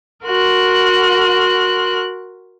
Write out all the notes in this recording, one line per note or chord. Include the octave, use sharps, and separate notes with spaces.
F#4 A#4 C6 F#6